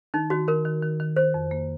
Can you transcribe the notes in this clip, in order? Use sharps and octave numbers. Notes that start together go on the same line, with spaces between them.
D#3 D#4
D#3 F#4
D#3 A#4
D#3
D#3
D#3
D#3 C5
F2
A#3